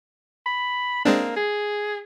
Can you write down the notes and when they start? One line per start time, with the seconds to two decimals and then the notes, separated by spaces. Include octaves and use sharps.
0.46 B5
1.05 G#3 A#3 C4 D4
1.36 G#4